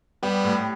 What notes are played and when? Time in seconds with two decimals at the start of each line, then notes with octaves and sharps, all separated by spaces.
0.22 G3 B3 G4
0.44 A2